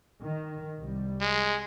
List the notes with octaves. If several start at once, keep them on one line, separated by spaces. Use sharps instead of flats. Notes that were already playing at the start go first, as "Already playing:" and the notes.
D#3
C2 G3
G#3